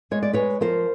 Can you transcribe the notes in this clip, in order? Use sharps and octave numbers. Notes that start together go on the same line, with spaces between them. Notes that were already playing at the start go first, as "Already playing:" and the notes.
G#3 C#5
D5
G#3 B4 C#5
F3 A#4 C5